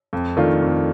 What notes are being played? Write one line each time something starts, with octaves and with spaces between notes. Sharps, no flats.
F2
D#3 A3 D4 F4
F2